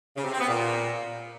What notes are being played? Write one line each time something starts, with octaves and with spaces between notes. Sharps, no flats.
C#3
C3
C4
B3
A#2